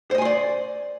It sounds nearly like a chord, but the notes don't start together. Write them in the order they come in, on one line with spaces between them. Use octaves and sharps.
C5 D#5 G#5 C6 D5